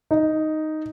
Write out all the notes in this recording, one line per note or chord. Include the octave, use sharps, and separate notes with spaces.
D#4